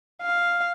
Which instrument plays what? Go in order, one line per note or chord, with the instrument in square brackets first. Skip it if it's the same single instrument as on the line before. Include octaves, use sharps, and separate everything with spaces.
[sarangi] F5